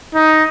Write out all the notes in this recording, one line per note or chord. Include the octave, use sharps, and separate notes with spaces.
D#4